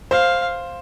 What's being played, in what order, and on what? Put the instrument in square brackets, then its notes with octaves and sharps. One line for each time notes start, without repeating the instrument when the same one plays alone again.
[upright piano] C5 [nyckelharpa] F5